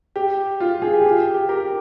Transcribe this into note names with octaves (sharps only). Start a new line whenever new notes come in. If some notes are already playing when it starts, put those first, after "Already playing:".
G4
F4
F4 G#4
G4
G4
G4
G4 A#4